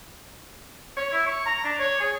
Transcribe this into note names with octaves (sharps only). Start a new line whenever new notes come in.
C#5
E4
C#6
A#5
D4
C#5
G#4